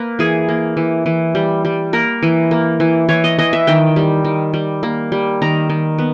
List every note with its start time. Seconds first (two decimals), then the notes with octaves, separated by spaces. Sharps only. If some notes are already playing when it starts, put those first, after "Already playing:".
Already playing: A#3 B4
0.19 E3 G#4
0.49 A#3
0.77 E3
1.06 E3
1.35 G3
1.65 G3
1.93 A#3 A#4
2.23 E3
2.51 A#3
2.80 E3
3.09 E3 C#5
3.24 D#5
3.38 E3 D#5
3.53 E5
3.67 D#3 G5
3.96 G3
4.25 D#3
4.54 G3
4.83 A#3
5.12 G3
5.42 D#3 A#5
5.69 D#3
5.98 B3